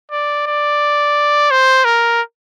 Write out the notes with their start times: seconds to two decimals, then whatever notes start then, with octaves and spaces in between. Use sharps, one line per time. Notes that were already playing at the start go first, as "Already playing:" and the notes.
0.12 D5
0.47 D5
1.51 C5
1.85 A#4